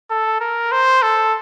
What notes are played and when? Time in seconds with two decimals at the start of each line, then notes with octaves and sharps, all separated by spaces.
0.10 A4
0.41 A#4
0.72 C5
1.02 A4